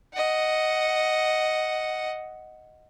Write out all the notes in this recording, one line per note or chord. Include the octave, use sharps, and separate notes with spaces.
D#5 F#5